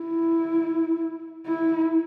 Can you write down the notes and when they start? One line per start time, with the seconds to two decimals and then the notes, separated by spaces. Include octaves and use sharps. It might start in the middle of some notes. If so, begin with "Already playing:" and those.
Already playing: E4
1.46 E4